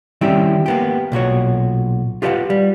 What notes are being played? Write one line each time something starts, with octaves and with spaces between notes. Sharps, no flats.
D#3 G3 C4 C#4 E4 G4
A#3 B3 G4
B1 A#2 F#4 C#5
F4 G4 B4 D5 F5 F#5
G3